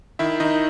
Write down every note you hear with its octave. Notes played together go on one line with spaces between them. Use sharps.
D#3 E4 E5
D#3 D#4 D#5